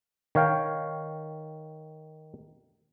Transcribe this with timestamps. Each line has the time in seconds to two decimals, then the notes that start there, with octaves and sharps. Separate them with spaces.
0.35 D#3 C#5 F5 G5